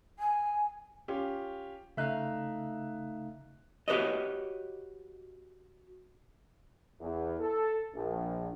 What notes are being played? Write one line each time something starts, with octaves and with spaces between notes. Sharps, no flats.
G#5
C#4 F4 G4
C#3 A3 D#4 E5 F5 F#6
F#4 G4 B4 C#5 D#5
E2
A4
A#1